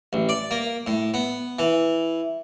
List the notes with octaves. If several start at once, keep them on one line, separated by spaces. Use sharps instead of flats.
A1
D5
A#3
A2
B3
E3